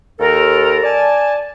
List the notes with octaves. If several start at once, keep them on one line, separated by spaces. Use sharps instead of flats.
D#2 A4 A#4
D5 G#5 A5